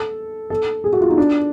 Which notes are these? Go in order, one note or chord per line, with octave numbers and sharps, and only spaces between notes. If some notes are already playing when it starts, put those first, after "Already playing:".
Already playing: A4
A4
G#4
F#4
F4
D#4
D4